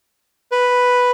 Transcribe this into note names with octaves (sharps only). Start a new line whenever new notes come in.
B4